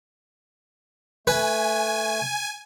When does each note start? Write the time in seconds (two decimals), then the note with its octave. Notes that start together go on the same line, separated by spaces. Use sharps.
1.27 A3 B4 G#5